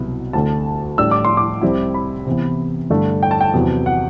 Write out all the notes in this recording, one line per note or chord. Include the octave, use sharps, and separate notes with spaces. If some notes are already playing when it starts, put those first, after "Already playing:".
Already playing: C2 B2 F#3 B3 E4
D2 D3 A3 A5
A2 G3 D4 E6
D6
C6
D6
C2 C3 G3 C4 E4
B5
C3 E3 B3
G2 D3 A3 D4
G5
A5
G5
E2 C3 F#3 B3
F#5